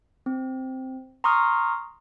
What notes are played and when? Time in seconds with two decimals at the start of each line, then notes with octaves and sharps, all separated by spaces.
0.26 C4
1.24 A#5 C6 C#6 D#6 F6